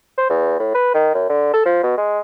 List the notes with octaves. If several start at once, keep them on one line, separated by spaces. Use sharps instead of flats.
C5
E2
A2
B4
D#3
F#2
D3
A4
F3
B2
G#3